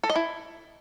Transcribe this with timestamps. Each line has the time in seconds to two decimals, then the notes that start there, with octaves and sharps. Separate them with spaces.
0.03 A4
0.10 D#5
0.16 E4